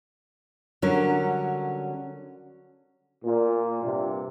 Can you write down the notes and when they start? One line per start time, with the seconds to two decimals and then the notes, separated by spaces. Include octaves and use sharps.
0.82 D3 F#3 G3 C#4 A#4 C#5
3.24 A#2
3.83 G2 C3